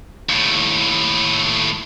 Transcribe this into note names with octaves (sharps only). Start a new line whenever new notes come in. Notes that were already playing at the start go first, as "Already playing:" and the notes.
D#2 A2